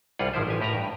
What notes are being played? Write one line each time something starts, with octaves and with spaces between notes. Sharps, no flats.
C2 G2 G3 F4 G#4 F#5
G#1 D3 F3 E4 C5
A1 G4 G#5
A2 G4 A#4 B4 A#5
G2